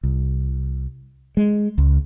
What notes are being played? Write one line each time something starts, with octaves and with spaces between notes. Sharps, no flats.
C2
G#3
C#2